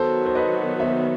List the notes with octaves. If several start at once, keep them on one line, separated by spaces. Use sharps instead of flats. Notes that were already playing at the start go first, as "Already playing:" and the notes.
Already playing: D#3 F#3 B3 F#4 A4 C5
C5
B4 D#5
C5 E5